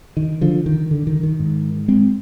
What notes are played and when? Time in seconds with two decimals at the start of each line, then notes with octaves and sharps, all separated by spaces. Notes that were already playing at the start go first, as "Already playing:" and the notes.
0.17 D#3
0.41 D3 F3
0.66 D#3
0.91 D3
1.07 D#3
1.23 D#3
1.40 G#2
1.88 G#3 C4